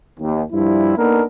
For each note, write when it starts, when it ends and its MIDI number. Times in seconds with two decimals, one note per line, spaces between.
0.19 0.42 39
0.53 0.96 43
0.53 0.96 53
0.53 0.96 55
0.53 0.96 64
0.98 1.23 58
0.98 1.23 59
0.98 1.23 62
0.98 1.23 63
0.98 1.23 69
0.98 1.23 70